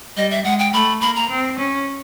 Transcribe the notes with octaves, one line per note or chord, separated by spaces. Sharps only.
G3 D#5
E5
G#3 F#5
G5
A3 B5
A#3 B5
A#5
C4
C#4